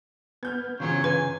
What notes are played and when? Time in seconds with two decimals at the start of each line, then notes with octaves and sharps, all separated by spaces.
0.43 B3 F6 G6 G#6
0.80 G1 E2 A#2 C#3 F#3 C5 C#5
1.04 B4 G#5